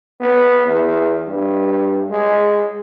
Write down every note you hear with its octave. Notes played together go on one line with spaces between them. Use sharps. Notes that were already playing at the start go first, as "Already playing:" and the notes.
B3
E2
G2
G#3